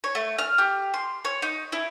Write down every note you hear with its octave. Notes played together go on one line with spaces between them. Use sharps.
C#5
A3
F6
G4
C6
C#5
D#4
E4